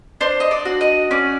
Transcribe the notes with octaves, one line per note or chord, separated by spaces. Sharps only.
D4 C5
D#5
D5
F#4
D#5
C#4 D5